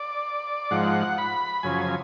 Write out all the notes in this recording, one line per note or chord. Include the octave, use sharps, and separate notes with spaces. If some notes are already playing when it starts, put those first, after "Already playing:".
Already playing: D5
G#2 F3 F#5
B5
F#2 C#3 F3 G#5